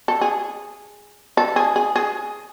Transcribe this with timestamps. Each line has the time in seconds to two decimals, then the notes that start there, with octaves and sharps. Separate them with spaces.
0.08 A4
0.21 G#4
1.37 A4
1.56 G#4
1.76 G#4
1.96 G#4